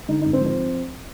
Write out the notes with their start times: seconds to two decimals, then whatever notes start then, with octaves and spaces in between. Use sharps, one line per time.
0.08 D3 D#4
0.21 D#4
0.25 G#1
0.33 C4
0.41 F3
0.46 C4